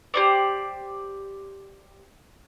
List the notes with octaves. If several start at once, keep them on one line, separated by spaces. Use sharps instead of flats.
G4 C5 D5